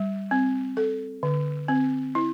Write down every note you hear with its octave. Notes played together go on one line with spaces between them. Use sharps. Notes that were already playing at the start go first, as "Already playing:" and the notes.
Already playing: G3
C4
A4
D3
C4
E4